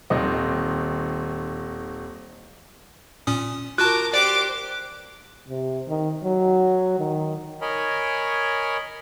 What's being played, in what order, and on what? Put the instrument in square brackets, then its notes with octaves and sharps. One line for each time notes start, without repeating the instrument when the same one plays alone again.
[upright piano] D#1 D#3 C4 D#5
[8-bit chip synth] A#2 C#4 D#6
[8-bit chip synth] F4 F#4 A5 [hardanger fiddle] A#4 D6 [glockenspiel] F#6
[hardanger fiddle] G4 C5 [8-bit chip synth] D5 [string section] D6
[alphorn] C3
D#3
F#3
D#3
[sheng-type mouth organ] A#4 C#5 D#5 G#5 B5